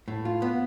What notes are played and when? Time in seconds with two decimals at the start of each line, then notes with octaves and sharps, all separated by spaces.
0.08 A2
0.25 F4
0.42 B3